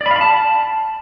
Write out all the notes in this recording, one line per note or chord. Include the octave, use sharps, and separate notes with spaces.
D5
B5
F5
B5
A5